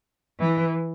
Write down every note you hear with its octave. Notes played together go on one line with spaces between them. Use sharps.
E3